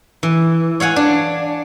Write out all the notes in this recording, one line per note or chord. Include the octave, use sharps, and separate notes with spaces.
E3
C#5 F5 F#5 G#5
D4